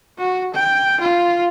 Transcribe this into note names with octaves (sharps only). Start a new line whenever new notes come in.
F#4
G5
F4